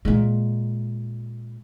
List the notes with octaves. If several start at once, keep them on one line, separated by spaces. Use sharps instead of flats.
A#2 G#3